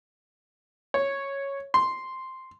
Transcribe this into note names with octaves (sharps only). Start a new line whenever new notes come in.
C#5
C6